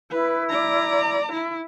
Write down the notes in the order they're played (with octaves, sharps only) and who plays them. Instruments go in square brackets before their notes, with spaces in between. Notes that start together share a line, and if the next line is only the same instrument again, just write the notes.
[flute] E4 [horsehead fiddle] B4
[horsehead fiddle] D5 A#5
E4